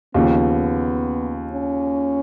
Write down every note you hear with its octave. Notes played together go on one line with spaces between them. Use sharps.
D#2 C#3 F3 B3
C#4